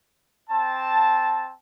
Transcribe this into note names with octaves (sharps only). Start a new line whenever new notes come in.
C4 A5